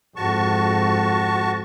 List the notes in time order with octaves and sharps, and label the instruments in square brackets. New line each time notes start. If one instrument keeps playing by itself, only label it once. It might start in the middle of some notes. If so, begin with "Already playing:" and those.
[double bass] F2 G#2 [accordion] F#4 A5 C#6